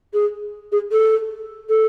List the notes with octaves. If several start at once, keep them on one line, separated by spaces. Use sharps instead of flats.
G#4
G#4
A4
A4